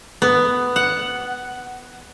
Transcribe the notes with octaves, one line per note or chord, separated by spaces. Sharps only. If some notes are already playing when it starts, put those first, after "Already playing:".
B3
F#5